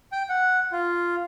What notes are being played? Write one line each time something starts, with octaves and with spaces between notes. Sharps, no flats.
G5
F#5
F4